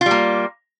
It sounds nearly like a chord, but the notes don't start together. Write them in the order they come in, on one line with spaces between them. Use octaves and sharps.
F4 G3 A#3